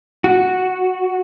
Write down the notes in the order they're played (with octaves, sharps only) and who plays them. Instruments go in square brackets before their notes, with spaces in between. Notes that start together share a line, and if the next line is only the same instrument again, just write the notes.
[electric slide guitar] F#4